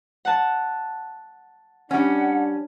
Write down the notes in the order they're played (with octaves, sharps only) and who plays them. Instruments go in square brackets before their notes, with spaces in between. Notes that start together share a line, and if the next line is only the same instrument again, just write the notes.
[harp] F#5 A5
[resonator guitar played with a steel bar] G3 C#4 [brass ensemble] D4 [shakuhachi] F#5